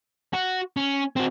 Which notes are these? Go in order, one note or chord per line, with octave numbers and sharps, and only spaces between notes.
F#4
C#4
C4 F#4